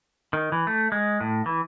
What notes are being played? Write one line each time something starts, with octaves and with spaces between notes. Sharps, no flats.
D#3
E3
A3
G#3
A2
E3